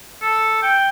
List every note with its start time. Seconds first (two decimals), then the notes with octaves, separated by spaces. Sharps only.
0.22 A4
0.62 G5